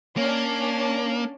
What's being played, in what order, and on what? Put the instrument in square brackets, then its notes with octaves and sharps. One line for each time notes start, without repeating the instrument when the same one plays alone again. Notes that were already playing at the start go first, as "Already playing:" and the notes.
[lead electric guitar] A#3 [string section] C#4 D4